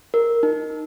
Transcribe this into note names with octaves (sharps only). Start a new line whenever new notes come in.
A#4
D#4